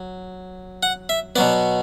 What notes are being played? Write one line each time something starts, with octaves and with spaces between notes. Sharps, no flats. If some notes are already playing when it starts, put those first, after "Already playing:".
Already playing: F#3
F#5
E5
B2 F#3 B3 D5